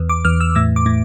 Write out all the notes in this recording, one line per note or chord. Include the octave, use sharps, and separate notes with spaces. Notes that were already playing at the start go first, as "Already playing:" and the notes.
Already playing: E2
D6
E2 F6
E6
A2 E6
D6
A2